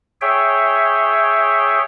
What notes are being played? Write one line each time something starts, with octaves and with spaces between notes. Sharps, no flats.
G#4 C#5 E5 G5